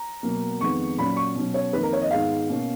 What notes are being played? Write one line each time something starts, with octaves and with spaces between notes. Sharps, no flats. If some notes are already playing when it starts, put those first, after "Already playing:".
Already playing: A#5
B2 F#3 A#3
F2 D#3 G#3 B3 C#6
A#2 F#3 C#4 B5
C#6
B2 F#3 C#4
C#5
F2 D#3 A#3 D#4 B4
A#4
C#5
D#5
G#2 D#3 G#3 B3 D#4 F5
B2 A#3 C#4